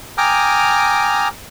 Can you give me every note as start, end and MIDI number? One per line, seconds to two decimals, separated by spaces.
0.18 1.28 79
0.18 1.28 80
0.18 1.28 82
0.18 1.28 86
0.18 1.28 87
0.18 1.28 89